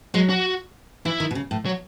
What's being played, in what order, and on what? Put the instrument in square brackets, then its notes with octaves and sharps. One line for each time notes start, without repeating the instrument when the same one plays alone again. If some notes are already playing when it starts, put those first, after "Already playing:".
[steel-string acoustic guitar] F#3 [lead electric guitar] G#3
[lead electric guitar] F#4
[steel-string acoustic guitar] E3 [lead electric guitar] E4
[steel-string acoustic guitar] D#3
B2
C#3
A2
[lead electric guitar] F#3